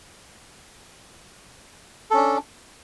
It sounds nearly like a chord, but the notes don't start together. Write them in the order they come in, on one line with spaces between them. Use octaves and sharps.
A4 C#4 D4